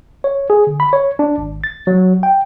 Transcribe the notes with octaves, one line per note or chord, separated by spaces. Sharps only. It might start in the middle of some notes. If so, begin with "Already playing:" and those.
C#5
G#4
D3
B5
C#5
D4
G#1
A6
F#3
G5